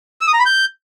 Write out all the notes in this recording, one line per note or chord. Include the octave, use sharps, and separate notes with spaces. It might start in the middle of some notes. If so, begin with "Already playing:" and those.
E6
D#6
A#5
B5
G6